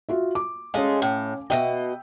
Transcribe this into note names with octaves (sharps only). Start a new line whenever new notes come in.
F4 F#4 E5
D6
G#3 A3 C#4 D#5 F5
A2
B2 F#3 D#5 E5 G5